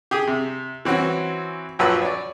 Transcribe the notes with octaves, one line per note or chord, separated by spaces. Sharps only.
G4 G#4 D#6
C3
E3 C4 C#4 F#4
A#1 F#2 F3 F#3 B4 E6
C#5 D5